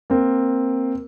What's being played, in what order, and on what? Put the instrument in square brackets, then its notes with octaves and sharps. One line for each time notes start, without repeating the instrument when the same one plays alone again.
[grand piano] A#3 C4